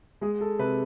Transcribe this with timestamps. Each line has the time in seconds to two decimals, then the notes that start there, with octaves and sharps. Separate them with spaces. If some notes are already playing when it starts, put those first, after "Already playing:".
0.21 G#3 G#4
0.41 A4
0.59 C3 B4